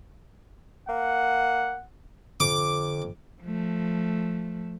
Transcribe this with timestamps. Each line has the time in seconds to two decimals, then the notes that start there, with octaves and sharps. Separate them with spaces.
0.89 A#3 F#5
2.40 F2 D3 D6
3.41 F3 A3